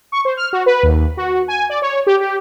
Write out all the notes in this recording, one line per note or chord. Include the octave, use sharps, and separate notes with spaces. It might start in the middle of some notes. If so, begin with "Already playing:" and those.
C#6
C5
F6
F#4
B4
D#2
F#4
G#5
D5
C#5
G4
G4